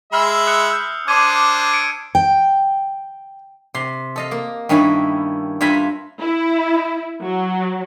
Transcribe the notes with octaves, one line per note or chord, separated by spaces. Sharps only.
G#3 E5 B5 E6 F6 C7
D#6 F#6 C#7
E6 G6
D4 C5 D6 G#6 D#7
C#7 D7
G5
C3 C6
A4 D#5 F5
A#3
G2 D#3 C#4 E4
G2 F4 E5 G#5 A#5 B5
E4
F#3